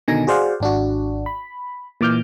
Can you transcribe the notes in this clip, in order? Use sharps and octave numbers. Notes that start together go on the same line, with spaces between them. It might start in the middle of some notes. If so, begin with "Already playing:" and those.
B2 D3 D#3 D#4 G#5 A#6
F#4 G#4 C5 D5 F5 F#5
G#1 D4 F#4
B5
A#2 E3 D6 F6 G6